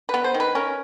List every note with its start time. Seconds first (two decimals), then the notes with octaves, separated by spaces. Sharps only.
0.09 B3 B4
0.24 C5
0.34 D#3
0.40 B4
0.55 C#4 A#4